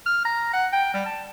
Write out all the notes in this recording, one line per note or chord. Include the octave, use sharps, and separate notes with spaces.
F6
A#5
F#5
G5
G3
A5